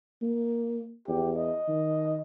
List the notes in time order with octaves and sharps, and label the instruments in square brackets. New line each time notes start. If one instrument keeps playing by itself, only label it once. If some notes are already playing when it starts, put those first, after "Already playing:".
[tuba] A#3
[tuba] E2 [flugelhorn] G4
[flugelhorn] D#5
[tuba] D#3